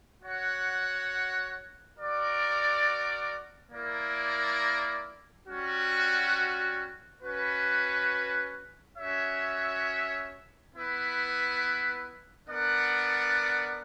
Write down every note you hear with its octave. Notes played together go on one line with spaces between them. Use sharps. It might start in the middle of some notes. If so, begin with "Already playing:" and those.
F#4 C#5 F#5
F#4 A#4 D5
A#3 E4 A#4 D5
G3 C#4 F#4
C#4 F#4 B4
C#4 F#4 C#5 E5
B3 E4 B4
B3 D4 A#4 D5 F#5